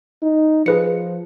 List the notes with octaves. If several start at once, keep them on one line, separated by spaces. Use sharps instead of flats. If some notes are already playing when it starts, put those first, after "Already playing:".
D#4
F3 G#4 B4 C#7